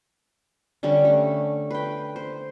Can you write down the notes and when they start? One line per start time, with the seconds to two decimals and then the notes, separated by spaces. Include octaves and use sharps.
0.83 D3 G3 C#4 D4
1.05 A3
1.71 B4 G5
2.16 C5